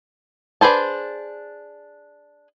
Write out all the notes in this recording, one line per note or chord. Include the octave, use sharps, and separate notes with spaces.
D4 G#4 B4 C5 A5